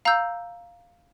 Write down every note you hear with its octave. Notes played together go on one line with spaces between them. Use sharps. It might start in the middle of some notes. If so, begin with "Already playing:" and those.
F5 A#5 E6 G6